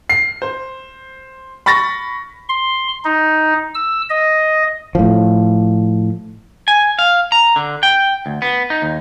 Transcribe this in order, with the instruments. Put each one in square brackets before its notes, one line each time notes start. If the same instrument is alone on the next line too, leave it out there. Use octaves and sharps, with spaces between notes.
[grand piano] C7
C5
B5 C#6 A6 A#6
[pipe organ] C6
D#4
E6
D#5
[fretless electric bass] A2 F3
[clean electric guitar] G#5
F5
A#5
D3
G5
D2
B3
D#4
D#2